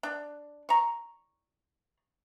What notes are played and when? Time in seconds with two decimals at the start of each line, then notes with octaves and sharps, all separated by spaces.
0.03 D4
0.69 A#5 C#6